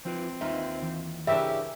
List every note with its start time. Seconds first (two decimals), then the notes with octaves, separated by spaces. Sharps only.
0.05 F3 C4 F4 B4
0.41 D#2 D#4 F4 B4 E5
0.82 E3
1.27 C#3 E3 D4 G4 A#4 E5